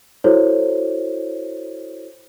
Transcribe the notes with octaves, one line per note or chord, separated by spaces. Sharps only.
E4 F#4 A4 C5 C#5